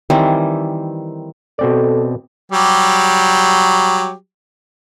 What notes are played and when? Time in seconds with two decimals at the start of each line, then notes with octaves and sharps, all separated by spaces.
0.10 D#3 E3 G3 C4
1.59 B2 C4 A4 D5
2.52 F#3 G3 G4